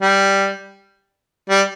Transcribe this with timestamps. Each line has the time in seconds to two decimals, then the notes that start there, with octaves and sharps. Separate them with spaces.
0.02 G3
1.50 G3